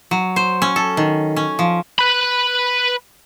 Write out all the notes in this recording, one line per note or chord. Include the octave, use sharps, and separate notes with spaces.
F#3
C5
C#4
A4
D#3
C#4
F3
B4 B5